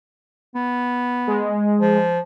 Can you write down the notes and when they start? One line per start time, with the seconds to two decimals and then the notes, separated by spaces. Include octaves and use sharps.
0.55 B3
1.27 G#3
1.80 F3